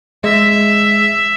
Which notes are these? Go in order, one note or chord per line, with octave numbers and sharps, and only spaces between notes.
G#3 E5